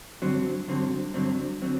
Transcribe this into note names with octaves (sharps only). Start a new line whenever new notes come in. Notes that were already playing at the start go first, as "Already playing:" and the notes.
G2 D3 F#3 C4
G2 D3 F#3 C4
G2 D3 F#3 C4
D3 F#3 C4